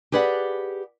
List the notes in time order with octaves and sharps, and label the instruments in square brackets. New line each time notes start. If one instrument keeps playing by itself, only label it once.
[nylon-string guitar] G4 G#4 B4 D5 F#5